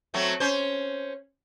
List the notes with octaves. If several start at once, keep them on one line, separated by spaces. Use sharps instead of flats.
F#3 A3 C4
C#4 C5